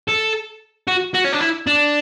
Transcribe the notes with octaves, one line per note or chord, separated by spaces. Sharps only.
A4
F#4
F#4
C#4
D4
E4
D4